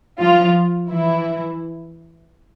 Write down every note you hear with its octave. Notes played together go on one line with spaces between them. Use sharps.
F3 F4
E3 E4